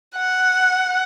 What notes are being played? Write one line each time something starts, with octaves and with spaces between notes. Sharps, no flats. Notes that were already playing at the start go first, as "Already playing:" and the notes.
F#5